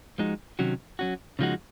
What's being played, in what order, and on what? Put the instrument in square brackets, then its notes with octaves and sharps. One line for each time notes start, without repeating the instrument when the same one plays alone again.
[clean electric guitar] F3 G#3 D#4 F#4
C3 D#3 F#3 C#4 F#4
F#3 C#4 F#4
C#3 F3 G#3 D#4 F#4